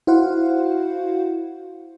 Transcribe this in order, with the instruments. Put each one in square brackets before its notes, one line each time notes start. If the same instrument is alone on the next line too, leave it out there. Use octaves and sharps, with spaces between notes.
[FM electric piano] E4 F#4 C5 F5 F#5